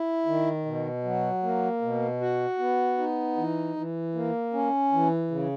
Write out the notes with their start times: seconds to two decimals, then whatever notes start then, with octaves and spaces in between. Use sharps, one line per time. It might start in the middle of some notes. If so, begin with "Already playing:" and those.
Already playing: E4
0.26 D#3
0.65 B2
1.04 F#3
1.43 A#3
1.82 B2
2.21 F#4
2.59 B3
2.98 D#4
3.37 E3
3.76 E3
4.15 A#3
4.53 C#4
4.92 E3
5.31 C#3